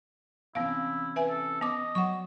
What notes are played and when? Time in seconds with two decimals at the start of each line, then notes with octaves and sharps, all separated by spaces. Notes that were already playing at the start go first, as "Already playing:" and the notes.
0.55 C3 E3 B3 C#4 E4 F5
1.16 B4 E5 G#5
1.29 A4
1.61 B3 D#5 D6
1.95 F#3 C#5 D5 F#5 C#6